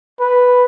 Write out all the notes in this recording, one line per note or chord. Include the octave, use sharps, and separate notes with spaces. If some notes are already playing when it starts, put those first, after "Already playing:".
B4